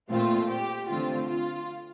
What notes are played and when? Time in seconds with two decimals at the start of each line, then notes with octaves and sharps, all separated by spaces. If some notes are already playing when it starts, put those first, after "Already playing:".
0.10 A#2 A3 C4 F4
0.50 G4
0.89 D3 A3 C4 F4
1.30 F4